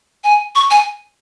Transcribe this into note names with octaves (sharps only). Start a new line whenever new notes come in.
G#5
C#6
G#5